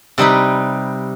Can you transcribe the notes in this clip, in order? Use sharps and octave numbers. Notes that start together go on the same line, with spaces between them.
C3 G3 D#4 B4